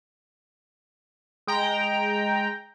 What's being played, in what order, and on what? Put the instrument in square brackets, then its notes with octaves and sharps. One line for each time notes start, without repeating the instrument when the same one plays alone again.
[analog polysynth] G#3 G5 A#5